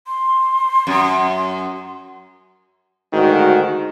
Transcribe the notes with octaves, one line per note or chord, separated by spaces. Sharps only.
C6
F#2
D2 G#2 D#3 F#4